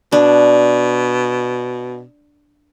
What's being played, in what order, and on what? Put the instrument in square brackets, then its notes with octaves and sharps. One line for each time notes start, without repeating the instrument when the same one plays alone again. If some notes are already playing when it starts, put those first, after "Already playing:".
[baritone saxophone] B2 [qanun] D4